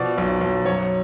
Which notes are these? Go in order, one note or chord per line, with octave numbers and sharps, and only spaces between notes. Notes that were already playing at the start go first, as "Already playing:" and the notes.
Already playing: B2 F3 D5
B1
B1
F#2 C#5